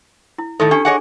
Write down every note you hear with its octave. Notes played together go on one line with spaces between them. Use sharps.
E4
A2 D#3 A3 A4
C#4 D4 G4
G#4 C#5 D#5 F#5 G#5 C#6